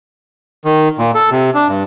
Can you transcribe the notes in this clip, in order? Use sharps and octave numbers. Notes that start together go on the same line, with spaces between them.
D#3
A#2
A4
C3
D4
G2